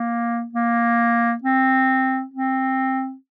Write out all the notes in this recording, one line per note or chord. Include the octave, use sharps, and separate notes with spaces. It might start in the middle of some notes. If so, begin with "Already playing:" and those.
Already playing: A#3
A#3
C4
C4